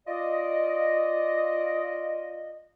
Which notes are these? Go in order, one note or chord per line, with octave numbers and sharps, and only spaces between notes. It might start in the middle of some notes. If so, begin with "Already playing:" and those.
F4 D5 D#5